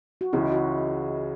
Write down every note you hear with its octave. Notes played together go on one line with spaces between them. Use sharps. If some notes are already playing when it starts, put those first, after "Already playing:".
F#4
C#2 C#3 E3 G#3 E4
F#4